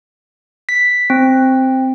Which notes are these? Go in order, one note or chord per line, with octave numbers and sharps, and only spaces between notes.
B6
C4